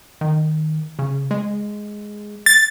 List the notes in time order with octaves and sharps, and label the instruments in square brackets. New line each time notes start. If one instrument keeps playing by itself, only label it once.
[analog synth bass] D#3
C#3
G#3
[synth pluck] A6